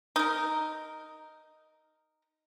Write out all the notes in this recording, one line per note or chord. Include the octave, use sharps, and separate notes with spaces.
D#4 A#4